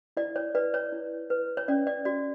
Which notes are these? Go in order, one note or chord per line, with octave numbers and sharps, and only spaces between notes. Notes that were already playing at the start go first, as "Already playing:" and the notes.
E4 D5
C#5
B4 D5
C#5
E4
B4
C#5
C#4 D5
D5
F#4 D5